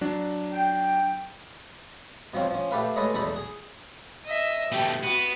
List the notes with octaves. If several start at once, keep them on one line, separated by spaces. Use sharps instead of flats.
F#3 D4
G5
B2 F3 C4 C#5 F5
F3 C#4
A3 G4 A4 B4 F5
G#3 A4 B4 C#5 D#5
B1 E2 D#4 A4 A#5 B5
G#4
D#5 E5
B2 A3 G4
B3 F#4